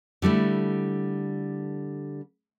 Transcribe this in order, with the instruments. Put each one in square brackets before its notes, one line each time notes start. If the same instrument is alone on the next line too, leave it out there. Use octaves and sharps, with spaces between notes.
[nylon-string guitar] D3 G3 A3 E4